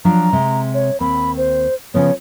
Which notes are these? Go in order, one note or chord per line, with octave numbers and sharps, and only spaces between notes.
F3 F#3 D4 A#5
C3 G#3
C#5
D#2 C4 B5
C5
C#3 F3 B3 C#5